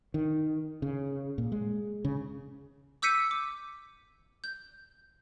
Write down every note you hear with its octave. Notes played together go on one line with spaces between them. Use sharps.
D#3
C#3
A#2
G#3
C#3
D6 E6 G6 B6 C#7 D#7
D6
G6